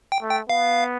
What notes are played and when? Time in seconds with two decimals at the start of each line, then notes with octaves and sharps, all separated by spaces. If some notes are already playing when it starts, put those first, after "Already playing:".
0.12 G5
0.22 A3
0.31 G5
0.48 B3 F5